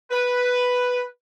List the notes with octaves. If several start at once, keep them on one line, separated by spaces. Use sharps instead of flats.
B4